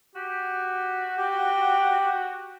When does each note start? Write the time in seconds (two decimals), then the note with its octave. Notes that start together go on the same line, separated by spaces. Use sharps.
0.15 F#4 G4
1.17 G4 G5